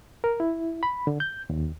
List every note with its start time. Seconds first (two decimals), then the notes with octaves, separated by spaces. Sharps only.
0.24 A#4
0.40 E4
0.83 B5
1.07 D3
1.20 G6
1.50 D#2